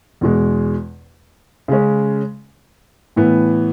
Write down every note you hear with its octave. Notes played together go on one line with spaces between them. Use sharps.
E2 B2 G#3
C#3 G#3 C#4
A2 E3 B3